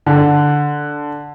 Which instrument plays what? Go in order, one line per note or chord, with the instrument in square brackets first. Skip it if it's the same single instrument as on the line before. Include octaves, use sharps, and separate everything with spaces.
[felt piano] D3